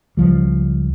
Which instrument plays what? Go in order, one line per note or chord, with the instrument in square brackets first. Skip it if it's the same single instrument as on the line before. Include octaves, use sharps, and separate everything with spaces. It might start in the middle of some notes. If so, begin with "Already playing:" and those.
[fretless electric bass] C#2 F3 G3